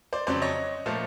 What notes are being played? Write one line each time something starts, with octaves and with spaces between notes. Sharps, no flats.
C5 D5
F2 C#3 F#3 C5 D5
C#5 D#5
A#2 F3 A3